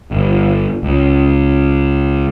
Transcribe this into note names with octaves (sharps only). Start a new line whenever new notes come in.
G1
C#2